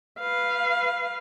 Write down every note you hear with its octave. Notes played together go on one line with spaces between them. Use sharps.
B4 F5